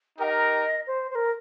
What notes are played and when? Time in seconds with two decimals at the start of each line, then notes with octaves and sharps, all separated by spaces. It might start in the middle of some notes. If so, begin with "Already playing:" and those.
0.19 D#4 G4 A#4 D#5 G5
0.87 C5
1.10 C5
1.15 A#4